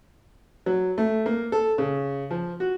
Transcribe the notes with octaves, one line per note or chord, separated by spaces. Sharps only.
F#3
A3
A#3
A4
C#3
F3
F#4